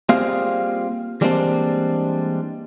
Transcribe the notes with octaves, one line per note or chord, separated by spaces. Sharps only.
G3 A#3 C4 F4 G#4 F5
E3 G3 G#3 A#3 C4 D4